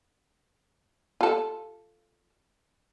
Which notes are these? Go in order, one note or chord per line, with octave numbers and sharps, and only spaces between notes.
F4 A4